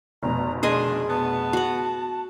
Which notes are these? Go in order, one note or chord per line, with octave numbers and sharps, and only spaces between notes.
F1 B2 A#5
D3 D#3 D4 G#4 D#5 G#5 C6
B3 A5
F#4 F#5